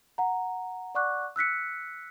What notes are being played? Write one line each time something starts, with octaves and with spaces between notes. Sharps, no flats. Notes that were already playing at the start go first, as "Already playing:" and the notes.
F#5 A#5
D5 F#5 C#6 D6 F#6
E6 F#6 B6 C#7